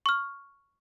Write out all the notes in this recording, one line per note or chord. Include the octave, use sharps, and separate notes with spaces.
C#6 F6